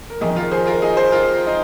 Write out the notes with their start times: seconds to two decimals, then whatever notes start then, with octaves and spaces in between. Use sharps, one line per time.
0.10 A#4
0.21 F2 D#3 D#4 G#4
0.36 F4 A#4
0.51 G#4 C5
0.67 F4 A#4
0.82 D#4 G#4
0.97 G#4 C5
1.12 F4 A#4
1.47 D#4